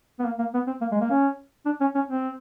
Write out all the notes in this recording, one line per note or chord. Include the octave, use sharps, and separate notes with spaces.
B3
A#3
A#3
B3
C4
A#3
G#3
A#3
C#4
D4
C#4
C#4
C4